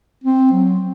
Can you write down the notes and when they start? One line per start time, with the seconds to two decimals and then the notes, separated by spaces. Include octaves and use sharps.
0.24 C4
0.53 F#3